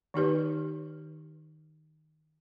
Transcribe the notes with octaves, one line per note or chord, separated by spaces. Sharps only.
D#3 D#4 G4 B4